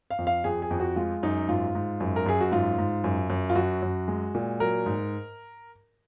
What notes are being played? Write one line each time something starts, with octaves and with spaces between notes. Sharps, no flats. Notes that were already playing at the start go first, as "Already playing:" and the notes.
F5
F2
F5
F2 G#4
G#4
F2
F#4
G#3 F4
F#2 D#4
G#2 F4
G#2
F#2
A#4
F#2 G#4
F#4
G#2 F4
G#2
F#2
F#2
F4
F#2 F#4
F#2
G#3
A#2
F#3 A#4
G#2